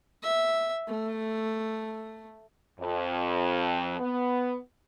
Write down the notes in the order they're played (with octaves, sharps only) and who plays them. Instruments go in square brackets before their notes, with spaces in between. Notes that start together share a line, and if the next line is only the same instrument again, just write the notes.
[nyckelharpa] E5
A3
[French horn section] F2
B3